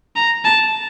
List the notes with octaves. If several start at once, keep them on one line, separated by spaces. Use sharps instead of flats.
A#5
A5